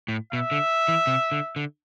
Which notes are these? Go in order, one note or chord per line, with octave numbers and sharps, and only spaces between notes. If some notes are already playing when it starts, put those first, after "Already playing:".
A2
B2 E5
D3
E3
C3
D3
D3